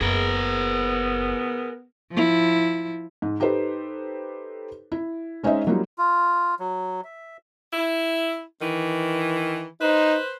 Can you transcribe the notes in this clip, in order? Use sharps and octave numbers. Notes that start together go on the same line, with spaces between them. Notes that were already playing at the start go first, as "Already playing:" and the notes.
F#1 B3 G#4 A#4
F3 E4
G#2
D#4 G4 A4 B4 C5
E4
G#3 C#4 D#4 C5 D#5 E5
F#3 G3 A#3 D#4 F4
F4
F#3
E5
E4
D#3 E3
D#4 B4 C5